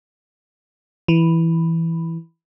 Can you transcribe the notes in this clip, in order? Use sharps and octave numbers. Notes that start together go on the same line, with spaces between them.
E3